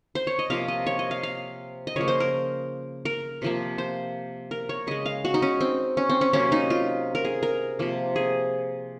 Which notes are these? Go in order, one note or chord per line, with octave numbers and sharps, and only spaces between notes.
C5
C#5
D#5
C3 F3 A#3 F5
D#5
C#5
D#5
F5
F5
D#5
C#3 F3 A#3 C#5
C5
A#4
A#4
C3 F3 A#3
C5
A#4
C#5
C#3 G#3 D#5
F5
F#4
D#4
C#4
C4
C#4
C4
C#4
C3 F#3 A#3 C#4
D#4
F4
A#4
G#4
A#4
C3 F3 A#3
G#4